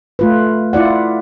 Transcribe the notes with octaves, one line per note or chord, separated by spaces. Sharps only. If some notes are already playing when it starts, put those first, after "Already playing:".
A3 F4 B4
E4 F4 D5 F#5